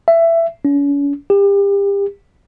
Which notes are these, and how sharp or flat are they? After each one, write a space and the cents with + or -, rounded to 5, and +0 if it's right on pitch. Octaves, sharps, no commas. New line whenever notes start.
E5 +15
C#4 +40
G4 +30